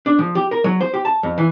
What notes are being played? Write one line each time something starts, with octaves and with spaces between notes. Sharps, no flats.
D4
F3
G4
A#4
F#3
C5
G4
A5
F2
E3